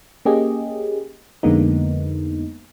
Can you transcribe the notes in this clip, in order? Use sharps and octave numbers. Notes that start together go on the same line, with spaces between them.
A#3 C#4 G4 G#4 D#5
F2 D3 G#3 A#3 B3 D#4